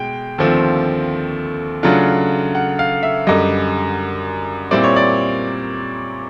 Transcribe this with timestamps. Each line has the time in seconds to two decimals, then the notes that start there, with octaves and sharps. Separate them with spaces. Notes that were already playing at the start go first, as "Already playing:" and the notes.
Already playing: B2 G#3 G5
0.38 D#2 D3 F3 A3 C4
1.83 C#3 F#3 A3 D4 F4
2.55 F#5
2.79 F5
3.03 E5
3.27 F#2 D3 G3 D#5
4.71 A#2 G3 C4 E4 D5
4.84 C#5
4.96 D5